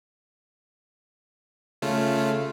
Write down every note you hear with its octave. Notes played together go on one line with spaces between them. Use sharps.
C#3 A3 F4